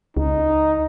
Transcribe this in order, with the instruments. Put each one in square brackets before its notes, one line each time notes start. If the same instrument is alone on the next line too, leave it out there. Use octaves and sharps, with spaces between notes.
[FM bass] C#2 [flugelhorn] D#4